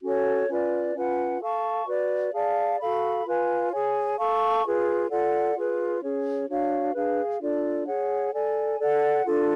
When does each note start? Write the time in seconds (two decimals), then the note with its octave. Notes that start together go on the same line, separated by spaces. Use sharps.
0.02 C#4 F#4 A4 C#5
0.49 C#4 F4 B4 D5
0.95 C#4 F4 B4 F#5
1.41 A4 F5 A5 C#6
1.87 F#4 B4 D5
2.33 G#4 D5 F5 A5
2.79 F#4 A4 F5 B5
3.26 F4 B4 F5 G#5
3.71 G#4 C#5 G#5
4.18 A4 F5 A5 C#6
4.64 F4 G#4 B4
5.10 F4 A4 D5 F#5
5.56 F4 G#4 B4
6.02 C#4 G#4 C#5
6.48 D4 F#4 C#5 F5
6.94 D4 G#4 B4 F5
7.40 D4 F4 A4 D5
7.87 G#4 C#5 F#5
8.32 A4 D5 G#5
8.79 A4 D5 F#5
9.25 D4 F4 A4